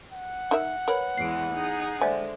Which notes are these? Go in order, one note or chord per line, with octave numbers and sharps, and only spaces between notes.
F#5
D#4 A#4 E5
A#4 B4 C#5 B5
E2 E3 G#3 C7 D7
D#4 G#4
D3 G#3 C5 D5 E5 G#5